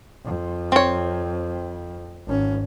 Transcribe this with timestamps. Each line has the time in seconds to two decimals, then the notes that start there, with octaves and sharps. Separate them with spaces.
0.25 F2
0.72 C4 C#5
2.27 G#1 C#4